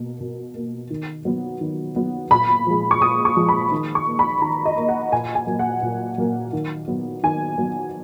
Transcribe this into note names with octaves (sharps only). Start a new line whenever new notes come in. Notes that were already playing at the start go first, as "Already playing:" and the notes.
Already playing: B2 A#3
B2
A#3
D#3
F#3 B3
D#3
F#3 B3
A#2 B5
F3 G#3
C#6
A#2 D#6
C#6
F3 G#3
B5
D#3
C#6
A#3
B5
D#3 A#5
D#5
A#3
F#5
A#2 G#5
G#5
F#3 A#3
F#5
A#2
F#3 A#3
D#3
F#3 B3
D#3 G#5
F#3 B3